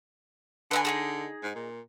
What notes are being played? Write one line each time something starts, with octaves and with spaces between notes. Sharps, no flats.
D3 B4 E5 G#5
D#4 F#4 G#4
G#2
A#2